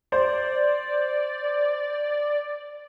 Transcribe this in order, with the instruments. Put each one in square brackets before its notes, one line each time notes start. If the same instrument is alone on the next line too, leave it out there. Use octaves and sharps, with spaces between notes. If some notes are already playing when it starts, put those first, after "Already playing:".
[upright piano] C5 [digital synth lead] D5